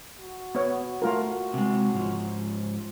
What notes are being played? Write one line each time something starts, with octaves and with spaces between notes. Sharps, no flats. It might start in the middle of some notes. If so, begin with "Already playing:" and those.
F#4
B3 C#5
A3 F4 A#4
C3 G#3
G#2 F3